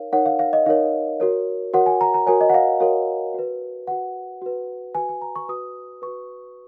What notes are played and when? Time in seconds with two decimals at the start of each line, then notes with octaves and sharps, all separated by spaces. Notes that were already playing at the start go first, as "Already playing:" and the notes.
Already playing: D#4 A#4 C#5 F5
0.13 D#4 A#4 C#5 F#5
0.26 F5
0.39 F5
0.53 D#5
0.66 D#4 A#4 C#5 F5
1.20 F#4 A#4 C#5
1.73 F#4 A#4 C#5 F#5
1.86 G#5
2.01 A#5
2.14 A#5
2.26 F#4 A#4 C#5 G#5
2.41 D#5
2.50 F#5
2.54 F5
2.80 F#4 A#4 C#5 F5
3.34 F#4 B4
3.87 F#4 B4 F#5
4.42 F#4 B4
4.95 F#4 B4 G#5
5.09 G#5
5.22 A#5
5.36 C#6
5.48 F#4 B4 D#6
6.02 F#4 B4 C#6